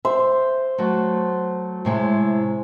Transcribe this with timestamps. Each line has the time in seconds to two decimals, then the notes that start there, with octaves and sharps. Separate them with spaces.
0.05 C5 E5
0.78 F#3 A3 F#4
1.85 A2 C3 G#3